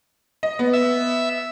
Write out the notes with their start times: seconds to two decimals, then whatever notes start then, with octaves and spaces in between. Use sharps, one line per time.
0.43 D#5
0.59 B3
0.73 E5